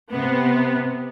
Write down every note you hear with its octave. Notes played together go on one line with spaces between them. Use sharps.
C3 B3